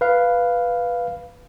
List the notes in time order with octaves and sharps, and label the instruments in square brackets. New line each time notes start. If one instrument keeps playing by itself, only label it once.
[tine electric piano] B4 F5